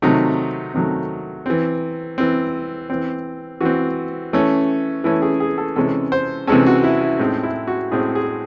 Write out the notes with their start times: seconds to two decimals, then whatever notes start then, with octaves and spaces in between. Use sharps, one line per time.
0.02 C3 D#3 F#3 A3 D#4
0.74 C3 D#3 F#3 A3
1.46 E3 C4
2.18 E3 C4
2.90 E3 C4
3.61 E3 C4 F#4
4.33 E3 A3 C#4
5.04 E3 A3 C#4 E4
5.22 G#4
5.40 G#4
5.58 A4
5.76 C3 E3 G#3 C#4 A4
6.12 C5
6.47 C3 E3 G#3 C#4 A4
6.66 F#4
6.84 E4
7.01 E4
7.19 A2 G#3 C4 D#4
7.43 E4
7.67 F#4
7.91 A2 G#3 C4 G#4
8.15 G#4